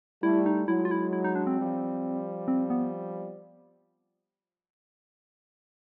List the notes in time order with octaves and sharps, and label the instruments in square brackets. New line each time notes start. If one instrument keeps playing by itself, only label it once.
[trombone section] G3 A3 [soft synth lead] E4
[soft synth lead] D#4
[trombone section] F#3 G#3 [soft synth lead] E4
[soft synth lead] F4
E4
E4
D#4
D4
C4
[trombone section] F3 G3
[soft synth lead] C4
B3